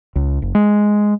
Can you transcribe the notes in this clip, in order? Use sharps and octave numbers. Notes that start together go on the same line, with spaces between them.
C#2
F#1
G#3